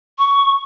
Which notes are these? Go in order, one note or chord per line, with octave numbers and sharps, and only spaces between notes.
C#6